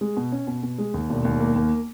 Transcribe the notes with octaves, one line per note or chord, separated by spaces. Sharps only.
G#3
B2
C#4
B2
B2
G#3
D#2
E1
D#2
A#3
D#2